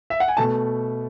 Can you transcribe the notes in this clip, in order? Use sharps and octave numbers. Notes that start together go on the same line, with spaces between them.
E5
F#5
G#5
B2 A3 A5